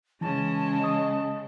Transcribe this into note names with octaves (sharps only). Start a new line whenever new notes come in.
C#3 E3 G#3 C#4 A5
D#5 D#6